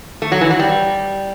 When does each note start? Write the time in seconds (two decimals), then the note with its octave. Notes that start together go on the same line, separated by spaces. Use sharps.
0.22 A3
0.32 F#3
0.41 E3
0.50 F#3
0.59 G3